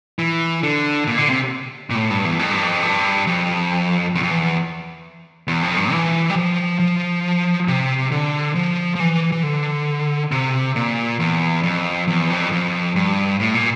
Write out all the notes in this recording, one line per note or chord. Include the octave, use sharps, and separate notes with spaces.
E3
D3
A#2
D3
C3
A#2
A2
G2
E2
F2
G2
F2
G2
F2
E2
F2
E2
E2
F2
G2
E3
G3
F3
F3
C3
D3
F3
F3
E3
E3
D3
C3
A#2
E2
F2
E2
F2
F2
G2
A2
A#2